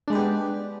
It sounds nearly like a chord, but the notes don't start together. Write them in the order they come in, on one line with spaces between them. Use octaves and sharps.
D4 G#3 B4 G4 B3